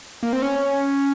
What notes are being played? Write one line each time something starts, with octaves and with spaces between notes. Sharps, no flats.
A#3
C4
C#4